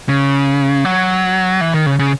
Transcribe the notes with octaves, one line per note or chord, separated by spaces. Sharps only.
C#3
F#3
E3
D#3
C#3
C#3